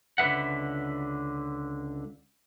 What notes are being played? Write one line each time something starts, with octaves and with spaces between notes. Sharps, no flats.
C#2 D3 B4 E5 F#5